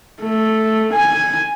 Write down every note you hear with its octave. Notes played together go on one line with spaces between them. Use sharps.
A3
G#5